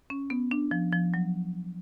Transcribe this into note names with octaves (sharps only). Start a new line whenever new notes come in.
C#4
B3
D4
F3
F3
F#3